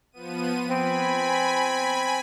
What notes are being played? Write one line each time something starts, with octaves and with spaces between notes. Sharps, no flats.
F3 B3 D#7
C4 G#5 B5